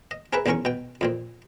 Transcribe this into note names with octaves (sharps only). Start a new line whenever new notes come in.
D#5
C4 G#4 A#4 B4 E5 A#5
B1 E2 C4 C#4 A#4 C#6
B2 G5
F2 A#2 C4